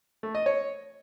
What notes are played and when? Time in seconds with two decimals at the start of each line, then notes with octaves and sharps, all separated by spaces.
0.23 A3
0.35 D#5
0.46 C#5